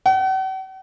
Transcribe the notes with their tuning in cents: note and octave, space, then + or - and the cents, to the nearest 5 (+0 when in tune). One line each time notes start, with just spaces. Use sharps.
F#5 +45